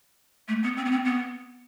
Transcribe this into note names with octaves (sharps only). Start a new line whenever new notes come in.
A3
B3
C4
B3
C4
B3